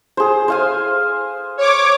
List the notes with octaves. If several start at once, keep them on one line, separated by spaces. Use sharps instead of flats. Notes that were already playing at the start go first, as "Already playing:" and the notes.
G#4 C5
C5 F5 G#5
C#5 D6